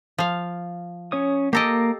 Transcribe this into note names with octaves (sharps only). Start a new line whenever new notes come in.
F3 F5
C#4 C#5 D#6
A#3 G4 A4 D#5 A#5 D6